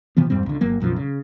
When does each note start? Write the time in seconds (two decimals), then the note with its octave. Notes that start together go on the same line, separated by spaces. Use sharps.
0.17 C3 E3 F3 B3
0.30 F2 G#2 G3 C4
0.46 C#2 D3
0.61 G1 F#3 A#3
0.80 B1 F#2 A2 F3
0.96 C#3